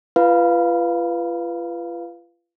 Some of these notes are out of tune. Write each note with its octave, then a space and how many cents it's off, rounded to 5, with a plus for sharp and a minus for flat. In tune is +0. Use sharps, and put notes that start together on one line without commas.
F4 -35 B4 +0 F5 +0